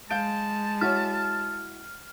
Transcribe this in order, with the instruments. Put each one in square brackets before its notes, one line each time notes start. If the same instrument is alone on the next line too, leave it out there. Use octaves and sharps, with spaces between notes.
[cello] G#3 [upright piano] F5 G6 D7 [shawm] A5
[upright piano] E4 F#4 C#5 [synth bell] F6